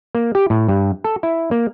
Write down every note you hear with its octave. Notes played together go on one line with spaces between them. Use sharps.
A#3
G4
A2
G2
A4
E4
A#3